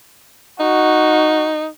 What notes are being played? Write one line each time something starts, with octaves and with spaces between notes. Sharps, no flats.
D#4 F#4